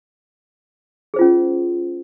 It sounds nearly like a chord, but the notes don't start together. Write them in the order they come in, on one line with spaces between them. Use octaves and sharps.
G#4 C5 F4 C#4